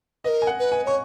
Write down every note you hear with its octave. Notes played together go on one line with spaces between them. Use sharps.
A#4 B4 D#5
G#5
F#5
B4
G#5
C#5 C#6